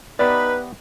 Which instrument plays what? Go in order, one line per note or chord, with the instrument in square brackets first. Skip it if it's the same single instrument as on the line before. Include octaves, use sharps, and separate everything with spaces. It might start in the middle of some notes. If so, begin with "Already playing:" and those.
[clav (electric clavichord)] B3 G4 E5 [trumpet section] D#4 B5 [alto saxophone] B4 [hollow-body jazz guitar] D5